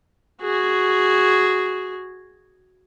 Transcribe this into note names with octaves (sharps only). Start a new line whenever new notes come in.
F#4 G#4